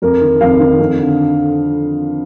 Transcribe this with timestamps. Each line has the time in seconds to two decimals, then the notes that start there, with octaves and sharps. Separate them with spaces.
0.02 F2 A#4
0.21 D#3
0.41 F2 F5
0.60 D#3
0.79 F2
0.99 D3